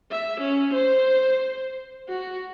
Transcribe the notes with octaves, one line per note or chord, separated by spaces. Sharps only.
E5
C#4
C5
F#4